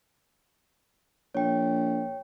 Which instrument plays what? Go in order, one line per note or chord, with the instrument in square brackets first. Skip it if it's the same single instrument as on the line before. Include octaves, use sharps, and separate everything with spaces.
[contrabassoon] A#1 [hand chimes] C#5 G5